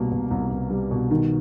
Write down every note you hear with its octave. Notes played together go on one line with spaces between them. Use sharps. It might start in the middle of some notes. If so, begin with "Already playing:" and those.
Already playing: C2 B2 G3 A#3
B2
C2
C2
G3
B2
D#3